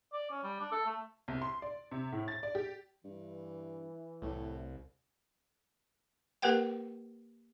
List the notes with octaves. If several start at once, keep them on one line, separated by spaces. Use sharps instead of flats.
D5
C#4
G3
D4
A4
A3
C2
C6
D5
C3
A2
A6
D5
G4
G2 E3
C2 A2
A#3 G4 A#4 B4 F#5 G5